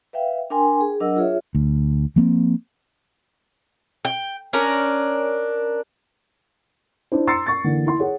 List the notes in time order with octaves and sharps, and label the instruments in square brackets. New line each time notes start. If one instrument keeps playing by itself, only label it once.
[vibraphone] B4 E5 F5 G5
D4 A#4 G5 G#5 C6
G#4
F#3 D4 A#4 D#5 F#5 E6
F4 G#4 C#5 E5
[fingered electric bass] D2
F3 A#3 C4
[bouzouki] G5
C#4 D4 A#4
[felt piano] D4 E4 C5
A#5 C6 E6 A6 C7 C#7
C#6 A6
D3 E3 A#3
E4 C6
G#4 C#5 F#5